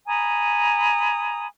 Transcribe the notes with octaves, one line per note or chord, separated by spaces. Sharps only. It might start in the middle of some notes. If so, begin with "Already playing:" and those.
G#5 A#5 B5 D#6